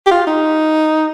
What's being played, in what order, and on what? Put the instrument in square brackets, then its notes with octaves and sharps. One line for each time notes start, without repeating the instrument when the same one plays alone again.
[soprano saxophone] G4
F4
D#4